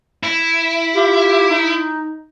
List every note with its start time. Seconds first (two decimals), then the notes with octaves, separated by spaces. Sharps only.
0.23 E4
0.94 F4 G4
1.50 D#4